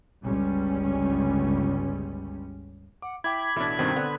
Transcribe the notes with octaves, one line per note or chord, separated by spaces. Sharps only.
G1 C#2 G3 C#4
F#5 D6
E4 G5 B5 D6 G#6
A1 B2 D4 E4 A4
G2 B2 D#3 C4 A#4
D3 B3 B4 F#5 C6